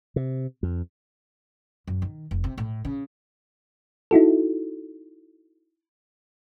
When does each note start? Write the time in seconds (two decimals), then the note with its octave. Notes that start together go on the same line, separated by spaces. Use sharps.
0.16 C3
0.63 F2
1.87 F#2
2.02 D#3
2.31 F1
2.44 C3
2.58 A2
2.85 C#3
4.11 D#4 E4 F#4 A4